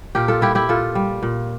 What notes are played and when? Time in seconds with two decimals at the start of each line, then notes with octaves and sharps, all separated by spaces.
0.15 A#2 G4 A#4
0.28 F4 A4
0.41 G3 E4 G4
0.55 E4 G4
0.69 A#2 F4 A4
0.95 G3
1.23 A#2